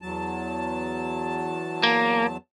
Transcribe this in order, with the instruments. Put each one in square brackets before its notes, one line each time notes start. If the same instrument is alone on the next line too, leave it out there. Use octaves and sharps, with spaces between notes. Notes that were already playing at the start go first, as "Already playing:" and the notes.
[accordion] E2 F#3 A5
[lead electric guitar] A#3